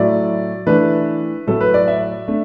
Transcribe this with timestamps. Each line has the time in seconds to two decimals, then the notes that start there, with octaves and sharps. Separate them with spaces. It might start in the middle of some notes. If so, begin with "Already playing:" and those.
Already playing: A2 F#3 A3 E4 D5
0.67 E3 A3 D4 B4
1.47 A2 F#3 A3 A4
1.61 B4
1.74 D5
1.88 E5
2.28 A3 D4